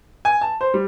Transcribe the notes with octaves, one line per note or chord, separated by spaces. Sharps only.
G#5
A5
C5
G3